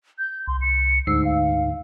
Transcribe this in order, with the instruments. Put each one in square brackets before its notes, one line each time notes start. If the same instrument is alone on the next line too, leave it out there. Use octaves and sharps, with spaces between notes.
[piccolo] G6
[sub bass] C2 [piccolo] C6
[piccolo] C#7
[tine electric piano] D2 G#2 C7 [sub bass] D3 [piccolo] E6
[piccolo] F5